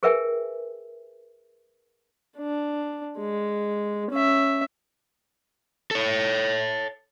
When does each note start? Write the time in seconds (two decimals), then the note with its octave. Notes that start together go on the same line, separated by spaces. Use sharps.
0.03 G#4 A#4 B4 E5 G5 G#5
2.37 D4
3.19 G#3
4.11 C#4 E5
5.91 A4 C#5